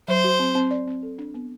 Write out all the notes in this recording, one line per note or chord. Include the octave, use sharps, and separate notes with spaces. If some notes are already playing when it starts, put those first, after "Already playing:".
F#3 C5
F#4
C4
C4
D5
C4
A4
D4
B3